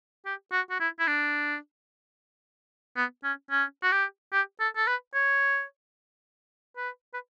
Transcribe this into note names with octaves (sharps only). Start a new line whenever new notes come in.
G4
F#4
F#4
E4
E4
D4
B3
C#4
C#4
F#4
G4
G4
A4
A4
B4
C#5
B4
B4